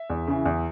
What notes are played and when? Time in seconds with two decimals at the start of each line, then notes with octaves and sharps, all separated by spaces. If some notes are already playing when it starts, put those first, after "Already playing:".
Already playing: E5
0.10 E2
0.27 C#3 E3
0.46 E2